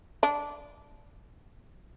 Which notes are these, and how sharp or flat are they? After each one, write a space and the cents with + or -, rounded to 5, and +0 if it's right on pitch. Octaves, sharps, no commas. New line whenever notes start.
D4 -10